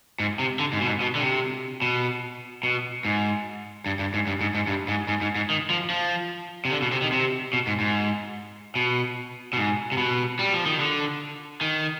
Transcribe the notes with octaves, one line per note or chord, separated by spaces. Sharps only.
G#2
C3
D3
G#2
B2
G#2
B2
D3
C3
B2
B2
G#2
G2
G2
G#2
G2
G#2
G#2
G2
G#2
G#2
G#2
G#2
D#3
F3
F3
C3
D3
B2
C3
D#3
C3
B2
G#2
G#2
B2
B2
G#2
C3
B2
G3
F3
D#3
D3
D#3